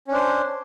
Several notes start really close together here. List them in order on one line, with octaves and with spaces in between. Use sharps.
C#4 D4 C5